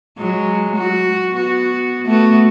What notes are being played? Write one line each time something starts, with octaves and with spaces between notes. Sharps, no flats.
F#3 G#3
F#4
B3 F#4
A3 B3 F#4